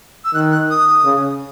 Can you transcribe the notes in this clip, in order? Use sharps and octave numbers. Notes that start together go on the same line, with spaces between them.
E6
D#3 F#6
F#6
D#6
C#3